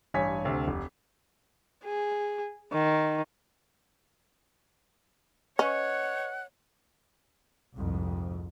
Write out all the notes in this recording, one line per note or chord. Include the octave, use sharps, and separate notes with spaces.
A1 G2 C#5 G#5 B6
D2 C3
F1
G#4
D#3
C#4 B4 C#5 D#5 F#5 C#6
C2 F2 G#2